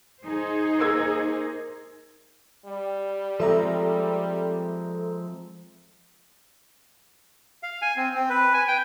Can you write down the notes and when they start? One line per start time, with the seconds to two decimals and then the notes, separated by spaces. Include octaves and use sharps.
0.24 D#4 G#4 C5
0.80 A#3 E6 G#6
2.66 G3
3.40 F3 G#3 C4 A4 E5 A#5
7.63 F5
7.82 G#5
7.97 C4
8.15 C4
8.30 B4
8.53 G#5
8.68 G5